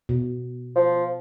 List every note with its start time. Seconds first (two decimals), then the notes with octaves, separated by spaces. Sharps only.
0.09 B2
0.75 F3